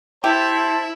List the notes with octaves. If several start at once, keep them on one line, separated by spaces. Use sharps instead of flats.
E4 G4 C5 E5 A5